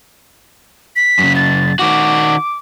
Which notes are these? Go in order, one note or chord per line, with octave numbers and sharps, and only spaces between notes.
B6
F#2 C#3
A6
D#3 F#4 D6